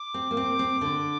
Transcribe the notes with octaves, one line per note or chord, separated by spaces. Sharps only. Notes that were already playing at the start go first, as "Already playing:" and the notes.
Already playing: D6
C4
A#3
C4
C4
D3